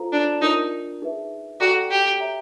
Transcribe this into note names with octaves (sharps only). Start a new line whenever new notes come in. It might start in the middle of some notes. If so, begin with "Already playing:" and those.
Already playing: F4 A4 C5 F5 A#5
D4
D4 D#4 F4 A#4 C#5
D#4 G#4 B4 E5
F#4 A4 D5 G5 A#5 D6
G4
C#5 E5 G5 A#5